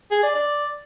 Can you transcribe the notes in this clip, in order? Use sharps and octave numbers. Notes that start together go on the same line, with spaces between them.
G#4
D5
D5